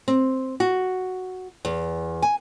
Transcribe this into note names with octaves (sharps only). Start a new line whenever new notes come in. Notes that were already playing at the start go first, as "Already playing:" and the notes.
C4
F#4
E2
G#5